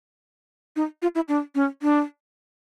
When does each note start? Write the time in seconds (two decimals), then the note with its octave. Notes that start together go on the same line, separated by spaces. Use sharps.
0.76 D#4
1.02 F4
1.15 E4
1.28 D4
1.55 C#4
1.82 D4